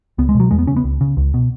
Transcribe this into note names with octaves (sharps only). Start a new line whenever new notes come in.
C#2 B3
G#3
B2
F#3
E2 G#3
B3
C#3 C#4
B3
C#2
C#3
C#2
B2